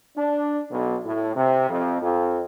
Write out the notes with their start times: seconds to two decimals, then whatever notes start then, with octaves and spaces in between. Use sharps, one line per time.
0.17 D4
0.71 B1
1.05 A2
1.35 C3
1.70 F2
2.02 F2